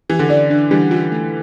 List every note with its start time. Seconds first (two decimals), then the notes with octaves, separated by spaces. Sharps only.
0.09 E3 G4
0.19 D3
0.29 E3 D5
0.50 D4
0.71 E3 G3 D4
0.91 F4
1.11 A3